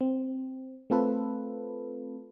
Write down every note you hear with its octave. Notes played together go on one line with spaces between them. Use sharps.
C4
A3 C4 F4 A4 B4